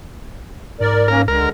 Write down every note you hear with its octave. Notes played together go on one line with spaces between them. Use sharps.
G#2 A#4 D5
A#3 C#4 A#4
C#2 D3 G#3 A#4